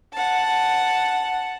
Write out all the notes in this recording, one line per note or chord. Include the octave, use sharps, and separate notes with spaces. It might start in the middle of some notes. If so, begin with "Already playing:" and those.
F#5 A5